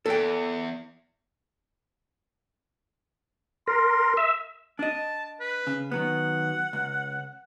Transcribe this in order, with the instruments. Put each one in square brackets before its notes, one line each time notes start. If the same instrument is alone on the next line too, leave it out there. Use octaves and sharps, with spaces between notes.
[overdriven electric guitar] E2 [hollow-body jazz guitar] A4 G5
[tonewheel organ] A#4 [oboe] C6
[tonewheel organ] E5
[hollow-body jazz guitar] D4 D#5 [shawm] A5
[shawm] B4
[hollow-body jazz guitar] C#3
[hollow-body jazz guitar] D#3 F#3 B3 [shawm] F#5
[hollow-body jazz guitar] C#2